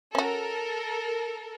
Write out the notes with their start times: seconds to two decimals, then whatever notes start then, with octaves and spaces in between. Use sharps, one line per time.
0.15 C#4 F#4 A4 A#4